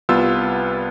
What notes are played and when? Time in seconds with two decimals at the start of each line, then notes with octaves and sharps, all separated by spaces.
0.09 C2 G3 B3 F4 E6